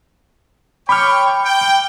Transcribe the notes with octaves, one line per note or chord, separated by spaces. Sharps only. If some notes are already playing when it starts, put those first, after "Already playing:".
C#5 G5 B5 C#6 D6 F6
G5